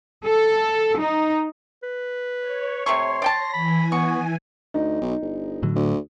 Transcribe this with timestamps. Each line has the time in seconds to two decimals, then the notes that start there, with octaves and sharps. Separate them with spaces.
0.25 A4
0.99 D#4
1.83 B4
2.39 C#5
2.86 C3 A3 C6 C#6
3.22 D5 G5 A5 A#6
3.53 E3 G#5 B5
3.92 B3 C#6
4.74 D2 D#4
5.01 B1
5.22 G1
5.63 A2 D3 F#3
5.75 D2